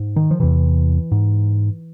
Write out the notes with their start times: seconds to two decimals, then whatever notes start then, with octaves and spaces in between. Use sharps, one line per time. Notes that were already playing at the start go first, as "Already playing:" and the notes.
Already playing: G#2
0.16 D#3
0.31 F3
0.40 E2 C3 E3
1.12 G#2